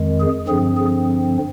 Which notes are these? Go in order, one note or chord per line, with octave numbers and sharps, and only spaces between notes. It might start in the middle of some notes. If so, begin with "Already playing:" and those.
Already playing: F2 D#3 G#3
G#4
G2 D3 F3 C4 G#4
G#4